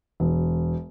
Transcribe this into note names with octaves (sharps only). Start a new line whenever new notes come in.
E1